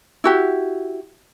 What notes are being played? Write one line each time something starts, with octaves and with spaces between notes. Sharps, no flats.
E4 F#4 G4